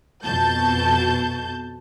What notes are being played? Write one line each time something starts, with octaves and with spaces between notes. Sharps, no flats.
F2 B2 A5 G6